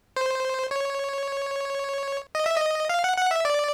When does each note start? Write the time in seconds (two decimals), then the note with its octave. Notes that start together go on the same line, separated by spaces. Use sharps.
0.16 C5
0.71 C#5
2.35 D#5
2.46 E5
2.57 D#5
2.89 F5
3.04 F#5
3.17 F#5
3.31 E5
3.45 D5